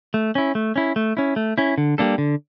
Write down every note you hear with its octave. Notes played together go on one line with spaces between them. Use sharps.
A3
C#4 E4
A3
C#4 E4
A3
C#4 E4
A3
C#4 E4
D3
G3 A#3 D4 A4
D3